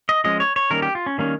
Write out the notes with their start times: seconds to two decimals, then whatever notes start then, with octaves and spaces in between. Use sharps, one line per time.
0.09 D#5
0.24 F3 G#3 C#4 D#5
0.40 C#5
0.56 C#5
0.70 D#3 G3 A#3 C#4 A#4
0.82 G4
0.95 F4
1.06 C#4
1.18 D#3 G3 A#3 C#4